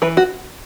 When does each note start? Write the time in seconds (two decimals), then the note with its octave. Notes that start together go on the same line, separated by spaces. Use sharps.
0.02 E3 B4
0.17 F#4